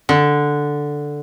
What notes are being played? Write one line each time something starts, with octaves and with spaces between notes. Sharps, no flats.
D3